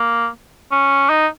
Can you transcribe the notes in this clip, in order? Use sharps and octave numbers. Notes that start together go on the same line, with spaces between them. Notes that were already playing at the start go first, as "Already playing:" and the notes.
Already playing: A#3
C#4
D#4